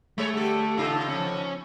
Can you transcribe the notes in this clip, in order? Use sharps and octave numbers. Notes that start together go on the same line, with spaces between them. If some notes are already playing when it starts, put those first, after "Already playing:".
G3 A3 G#4 C#5
D3 G4 A4
A2 C#3 D#4 F4 A4
F3 C#4